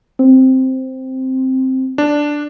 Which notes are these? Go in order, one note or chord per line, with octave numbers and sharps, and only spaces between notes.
C4
D4